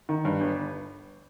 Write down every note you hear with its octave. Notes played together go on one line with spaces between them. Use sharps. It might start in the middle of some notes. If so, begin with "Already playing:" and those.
D#3
G2
G1